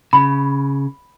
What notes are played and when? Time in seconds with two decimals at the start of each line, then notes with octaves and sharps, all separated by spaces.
0.13 C#3 B5